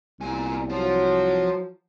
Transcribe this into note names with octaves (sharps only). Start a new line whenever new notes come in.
C2 A#2 G#5
F3 F#3